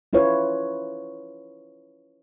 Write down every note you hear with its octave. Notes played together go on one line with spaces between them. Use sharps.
C#4 E4 F4 B4 C#5